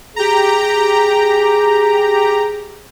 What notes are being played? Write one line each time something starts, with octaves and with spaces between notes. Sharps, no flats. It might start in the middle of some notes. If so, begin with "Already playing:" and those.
G4 G#4 A#5